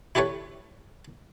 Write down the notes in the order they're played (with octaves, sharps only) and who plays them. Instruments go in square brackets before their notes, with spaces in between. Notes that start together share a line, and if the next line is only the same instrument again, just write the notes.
[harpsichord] E4 G4 A4 B4 C#5